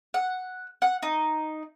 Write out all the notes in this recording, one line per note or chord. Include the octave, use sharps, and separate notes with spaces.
F#5
F#5
D#4